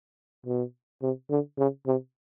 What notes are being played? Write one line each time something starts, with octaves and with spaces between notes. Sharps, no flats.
B2
C3
D3
C#3
C3